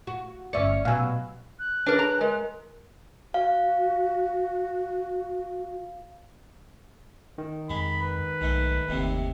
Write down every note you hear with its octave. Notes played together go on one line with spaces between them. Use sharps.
F#4
G1 C#4 D5 E5 C#7
B2 F#3 F5 G#5 E6
F#6
D4 G#4 A#4 B4 C#5
A#5
G#3 A#4
F#4 F5
D#3
F2 G#3 B5
B4
B1 G#2 A3
F#1 D#2 A2 C3